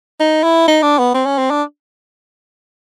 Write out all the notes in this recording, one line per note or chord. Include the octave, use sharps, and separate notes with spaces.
D#4
E4
D#4
D4
B3
C4
C#4
C4
D4